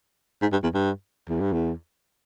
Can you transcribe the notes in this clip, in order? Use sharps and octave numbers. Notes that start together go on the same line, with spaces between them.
G#2
G2
E2
G2
E2
G2
E2